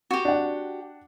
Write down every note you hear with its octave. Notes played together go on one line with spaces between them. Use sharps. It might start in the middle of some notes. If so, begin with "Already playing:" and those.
F#4 G4
D4 F#5